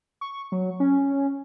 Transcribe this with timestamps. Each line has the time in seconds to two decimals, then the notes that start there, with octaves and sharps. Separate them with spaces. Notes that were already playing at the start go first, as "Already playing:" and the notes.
0.21 C#6
0.52 F#3
0.80 C#4